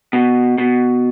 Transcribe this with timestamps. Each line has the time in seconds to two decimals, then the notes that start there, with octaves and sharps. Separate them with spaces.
0.13 B2
0.58 B2